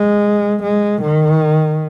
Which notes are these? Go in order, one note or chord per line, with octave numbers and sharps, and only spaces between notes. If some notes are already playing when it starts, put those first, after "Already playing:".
Already playing: G#3
G#3
D#3